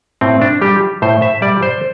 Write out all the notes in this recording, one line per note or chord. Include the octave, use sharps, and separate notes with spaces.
A2 C4
D4
G3 G4
A2 C5
E5
G3 D5
C5